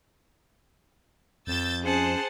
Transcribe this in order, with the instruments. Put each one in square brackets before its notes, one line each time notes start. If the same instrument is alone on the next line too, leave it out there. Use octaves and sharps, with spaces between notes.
[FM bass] F2 [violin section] E6 G6 A6
[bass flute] C#4 [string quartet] G#4 F#5 A5 [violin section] C5